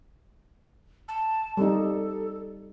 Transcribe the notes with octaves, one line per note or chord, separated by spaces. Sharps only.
A5
G3 C4 D#4 A4